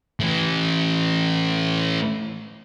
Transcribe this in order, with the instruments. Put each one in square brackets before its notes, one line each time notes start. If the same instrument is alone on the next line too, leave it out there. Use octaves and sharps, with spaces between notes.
[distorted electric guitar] A2 E3